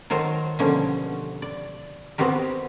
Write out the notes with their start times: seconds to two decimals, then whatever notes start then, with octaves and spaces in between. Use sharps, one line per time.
0.10 D#3 F#3 A#4 C5 A5
0.59 B2 D3 F3 G3 A#3 C#4
1.42 D5
2.18 B3 C4 F#4 G4 A#4